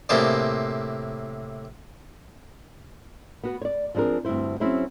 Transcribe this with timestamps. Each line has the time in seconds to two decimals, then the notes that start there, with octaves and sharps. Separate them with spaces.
0.09 A2 C3 A#3 G#4 C5 D5
3.44 B3 F#4 B4
3.62 C#5 D5
3.95 F3 C4 D4 G#4 A#4
4.25 D2 G2 C4 E4 C5
4.60 F#3 C4 C#4 E4 G#4 C5